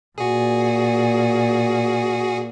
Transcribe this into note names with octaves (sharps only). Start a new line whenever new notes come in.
A#2 F#4 G#4